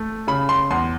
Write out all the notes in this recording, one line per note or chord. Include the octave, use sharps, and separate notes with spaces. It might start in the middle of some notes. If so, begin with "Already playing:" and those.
Already playing: A3
C#3 B5
C6
E2 C6